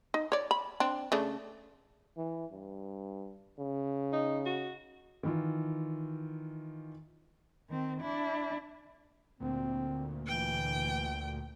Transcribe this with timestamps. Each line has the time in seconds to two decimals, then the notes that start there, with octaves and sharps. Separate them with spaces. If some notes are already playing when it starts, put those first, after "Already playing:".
0.14 D#4
0.32 C#5 D5
0.51 B5
0.80 C4 D4
1.12 C#3 A3 D4
2.17 E3
2.51 G2
3.59 C#3
4.13 D#4
4.46 F#4
5.23 D#3 E3 F4
7.69 D#3 C4
8.01 D4 E4
9.40 D2 A#2 C4
10.27 E3 G5